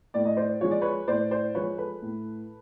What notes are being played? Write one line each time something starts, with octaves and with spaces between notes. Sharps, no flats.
A2 D5
D#5
C5 D5
F3 G#3 C#5
D5
B4 C#5
A2 C5 D5
C5 D5
F3 G#3 B4 C#5
A4 B4
A2